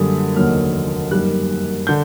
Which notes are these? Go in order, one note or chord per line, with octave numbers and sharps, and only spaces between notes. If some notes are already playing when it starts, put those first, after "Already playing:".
Already playing: F#2 D3 G3 A#3 D#6
F1 D#2 D3 F#3 A#3 F6
F#2 D#3 G3 A#3 F#6
D3 G6